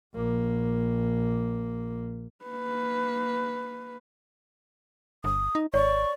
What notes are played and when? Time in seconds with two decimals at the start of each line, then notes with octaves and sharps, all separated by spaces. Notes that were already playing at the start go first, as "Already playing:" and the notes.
0.15 A#1 A#3
2.45 A#3 B4
5.24 G1 D#6
5.55 D#4
5.74 G#1 C#5 D5 C#6